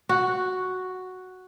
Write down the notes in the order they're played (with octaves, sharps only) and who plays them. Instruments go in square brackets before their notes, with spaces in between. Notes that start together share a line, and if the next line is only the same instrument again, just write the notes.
[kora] F#4